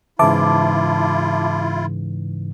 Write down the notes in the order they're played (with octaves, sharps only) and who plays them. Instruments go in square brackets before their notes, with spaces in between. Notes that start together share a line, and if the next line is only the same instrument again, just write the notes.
[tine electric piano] G#2 C#3 E3 [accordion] E4 F4 [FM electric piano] E5 A5 D6